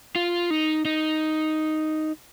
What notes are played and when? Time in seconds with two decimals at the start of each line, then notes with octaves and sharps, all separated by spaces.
0.16 F4
0.50 D#4
0.85 D#4